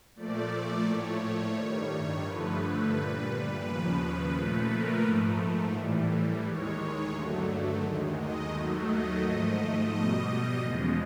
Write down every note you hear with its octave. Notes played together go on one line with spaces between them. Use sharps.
A#2 F3 A3 D5
A2 F3 A3 C#5
G2 D#3 G3 C#5
G2 D3 F3 A3 B4
A#2 G3 B4
D#2 C#3 F3 B4
A#2 F3 A3 B4
A#4
G#2 F3 A3
A2 E3 G3
D#2 D#3 G#3 C#5
G2 D3 F#3 A3
D#2 D#3 G#3
D#5
D#2 D#3 F#3 A3
D#5
G#2 F3 A3 D#5
B2 G3 D#5
E2 C#3 F3 G#3